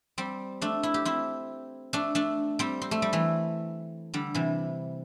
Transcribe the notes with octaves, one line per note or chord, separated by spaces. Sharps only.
G3 C4
A3 D4
E4
G4
C4 E4
A3 D4
A3 D4
G3 C4
C4
A3
G3
E3 A3
D3 G3
C3 E3